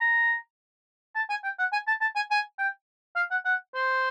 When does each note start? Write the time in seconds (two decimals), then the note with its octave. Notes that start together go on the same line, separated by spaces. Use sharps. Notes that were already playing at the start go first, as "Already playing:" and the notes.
0.01 A#5
1.16 A5
1.30 G#5
1.44 G5
1.59 F#5
1.73 G#5
1.88 A5
2.01 A5
2.16 G#5
2.31 G#5
2.59 G5
3.16 F5
3.31 F#5
3.45 F#5
3.75 C5